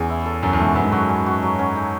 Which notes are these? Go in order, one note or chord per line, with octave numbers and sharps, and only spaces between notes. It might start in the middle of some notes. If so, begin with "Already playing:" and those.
Already playing: E2 G#3 C#4 G#4
E4
A4
F#2 F#3
E2
G#2 A3
F#2
F#2 B3
G#2
F#2 F#4
C#4
F#4
F#3
C#4
D#4